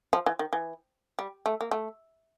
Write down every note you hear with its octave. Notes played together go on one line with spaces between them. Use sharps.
F3
E3
D#3
E3
G3
A3
A#3
A3